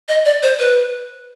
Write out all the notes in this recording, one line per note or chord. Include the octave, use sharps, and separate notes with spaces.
D#5
D5
C5
B4